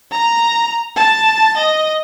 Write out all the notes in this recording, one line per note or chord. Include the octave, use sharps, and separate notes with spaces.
A#5
A5
D#5